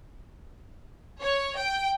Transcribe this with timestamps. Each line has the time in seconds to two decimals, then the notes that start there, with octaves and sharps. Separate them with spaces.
1.20 C#5
1.56 G5